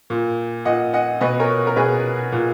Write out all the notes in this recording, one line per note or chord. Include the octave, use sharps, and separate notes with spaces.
A#2
A#2 D#5 F#5
D#5 F#5
B2 B4 D#5
A#4 C#5
A#4
B2 G#4 B4
A#2